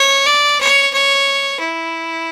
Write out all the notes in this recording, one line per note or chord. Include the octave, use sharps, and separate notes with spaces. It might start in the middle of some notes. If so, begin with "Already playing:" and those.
Already playing: C#5
D5
C#5
C#5
E4